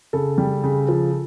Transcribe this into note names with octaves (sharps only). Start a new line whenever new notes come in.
C#3 A4
G3
C#3
F3